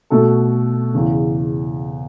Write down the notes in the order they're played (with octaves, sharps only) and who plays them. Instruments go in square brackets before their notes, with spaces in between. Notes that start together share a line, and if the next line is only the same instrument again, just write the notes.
[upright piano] B2 A3 F#4 A4
E2 C#3 E3